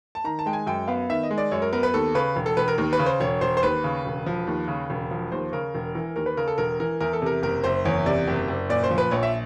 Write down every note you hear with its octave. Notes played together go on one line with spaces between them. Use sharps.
A5
D#3 A#5
A5
G#3 G5
G#5
F#2 G5
B3 F5
D#3 E5
D#5
G#3
D5
F#2 C#5
A#4
B3 A#4
B4
D#2 A4
C#3 B4
E1
A4
E1 B4
A#4
D#2 A#4
B4
C#3
C5
E1 C#5
E1 C5
C5
D#2 B4
C#3
E1
F3
D#2
C#3
E1
F3
D#2 C5
C#3 A#4
E1
E3
D#2 A#4
B4
C#3 A#4
A4
E1 A#4
E3 A#4
E2 A#4
A4
C3 A#4
F#1 A#4
F#1 C5
E2 C#5
C3 D5
F#1
F#1
A#2 D5
C5
F3
B4
A#1 C#5
E5